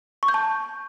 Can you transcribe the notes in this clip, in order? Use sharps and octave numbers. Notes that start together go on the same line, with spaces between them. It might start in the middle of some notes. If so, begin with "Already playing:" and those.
C#6
G6
A5